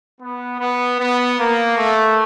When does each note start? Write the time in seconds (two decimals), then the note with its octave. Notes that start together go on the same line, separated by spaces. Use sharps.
0.21 B3
0.59 B3
0.99 B3
1.38 A#3
1.77 A3